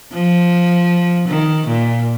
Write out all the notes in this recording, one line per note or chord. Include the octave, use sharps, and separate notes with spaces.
F3
D#3
A#2